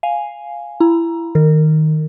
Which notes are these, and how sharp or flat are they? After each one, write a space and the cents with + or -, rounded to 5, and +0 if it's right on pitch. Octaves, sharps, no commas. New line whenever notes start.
F5 +0 G#5 +0
E4 +20 A#5 +15
D#3 +0 A#4 -25